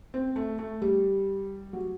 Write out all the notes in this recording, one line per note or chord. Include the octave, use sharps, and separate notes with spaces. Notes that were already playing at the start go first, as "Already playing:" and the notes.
C4
A3
A3
G3
F#3